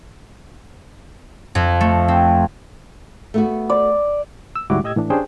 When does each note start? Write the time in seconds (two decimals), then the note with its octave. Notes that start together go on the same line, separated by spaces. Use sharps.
1.55 F2
1.81 A3
2.08 C4
3.34 A3 B3 F#4
3.69 D5
4.56 E6
4.70 D2 G#2 G3 E4 F#4 D6
4.84 A2 G4 D#5 E6 G#6
4.96 A2 E3 D4
5.10 C#4 D4 G4 G#4 C5 G5